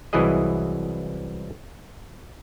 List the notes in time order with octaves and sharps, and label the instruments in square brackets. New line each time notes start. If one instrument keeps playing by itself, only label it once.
[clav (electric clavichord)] C2 E3 F#3 E4 G#4 D#5